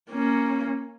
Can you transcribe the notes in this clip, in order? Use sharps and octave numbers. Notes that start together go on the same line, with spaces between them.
A#3 C#4